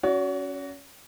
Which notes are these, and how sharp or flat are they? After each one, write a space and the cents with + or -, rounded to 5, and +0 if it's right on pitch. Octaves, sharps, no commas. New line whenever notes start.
C#4 +0 F#4 +0 C#5 +45